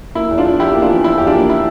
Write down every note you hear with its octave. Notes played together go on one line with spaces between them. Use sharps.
A#3 E4
E2
D4 F4
E2
E2 E4 G4
A#3
D4 F4
E3
E3 E4
E2 G4
D4 F4
A#3
E4